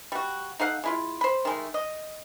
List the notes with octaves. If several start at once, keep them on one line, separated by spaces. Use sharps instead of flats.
G3 F#4
D#4 A4 F5 F#5
G#3 E4 F4
C5 B5
D#3 G#3 A3
D#5